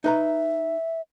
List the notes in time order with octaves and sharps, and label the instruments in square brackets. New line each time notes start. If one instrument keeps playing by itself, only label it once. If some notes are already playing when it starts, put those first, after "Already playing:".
[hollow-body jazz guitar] D#4 B4 A#5 [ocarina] E5